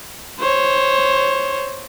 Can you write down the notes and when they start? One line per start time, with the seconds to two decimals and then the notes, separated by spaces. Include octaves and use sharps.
0.41 C5 C#5